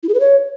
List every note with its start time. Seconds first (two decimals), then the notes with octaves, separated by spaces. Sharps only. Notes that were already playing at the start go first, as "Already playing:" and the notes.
0.03 E4
0.09 G#4
0.14 B4
0.20 C#5